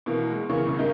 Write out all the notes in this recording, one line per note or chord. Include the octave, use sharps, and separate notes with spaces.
B2 E3 A#3
G#3
C#3 E3 A#3 G#4 C#6
C2 C#3
G2 A#3 D#4